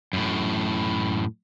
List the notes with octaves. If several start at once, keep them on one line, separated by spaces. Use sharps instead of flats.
F#2 A2